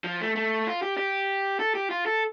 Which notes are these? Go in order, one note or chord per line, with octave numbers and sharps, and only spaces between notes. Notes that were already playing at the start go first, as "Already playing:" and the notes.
F3
A3
A3
F4
G4
G4
A4
G4
F4
A4